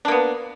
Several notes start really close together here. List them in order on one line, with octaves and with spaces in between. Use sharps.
D4 A#3 B3